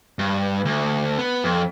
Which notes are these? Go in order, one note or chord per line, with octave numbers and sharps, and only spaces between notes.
G2
D2
B3
F2